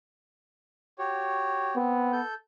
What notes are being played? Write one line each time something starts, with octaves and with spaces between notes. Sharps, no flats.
F#4 G4 C#5
B3 C4
A4 G6